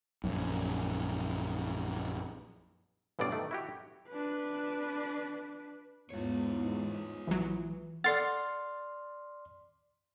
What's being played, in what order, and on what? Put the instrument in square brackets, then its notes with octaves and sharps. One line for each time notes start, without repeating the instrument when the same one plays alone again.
[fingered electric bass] A#1 F#2
[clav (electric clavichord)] A1 G2 B2 G3 D5 F5
D#3 A3
E4 F#4 G4
[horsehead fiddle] D4 B4
[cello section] E2 G#2 [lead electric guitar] F4 C#5
[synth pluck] A#1 F#3 [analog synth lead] E3
[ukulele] A4 F#5 [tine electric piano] D5 C6 F6 [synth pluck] A6 C7